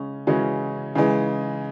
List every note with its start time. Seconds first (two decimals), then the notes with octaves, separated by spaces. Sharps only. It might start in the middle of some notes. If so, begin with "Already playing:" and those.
Already playing: C#3 G#3 C#4
0.27 C#3 E3 G#3 C#4 F#4
0.95 C#3 E3 G#3